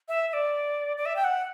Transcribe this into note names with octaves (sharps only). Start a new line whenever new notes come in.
E5
E5
D5
D5
E5
G5
F#5